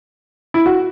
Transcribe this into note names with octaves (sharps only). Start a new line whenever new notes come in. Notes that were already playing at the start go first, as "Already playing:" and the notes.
E4
F#4